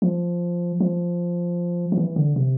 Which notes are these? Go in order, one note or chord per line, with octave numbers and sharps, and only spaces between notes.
F3
F3
F3
E3
D3
C3